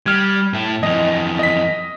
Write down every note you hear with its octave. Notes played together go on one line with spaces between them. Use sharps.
G3 F6 G#6
A2 E4
F2 E3 D#5
D#5 B6